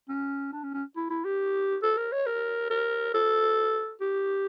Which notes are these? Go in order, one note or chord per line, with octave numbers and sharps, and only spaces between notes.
C#4
D4
C#4
C#4
E4
E4
G4
A4
A#4
C#5
A#4
A#4
A4
G4